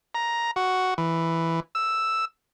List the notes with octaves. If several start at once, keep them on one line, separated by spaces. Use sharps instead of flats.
A#5
F#4
E3
E6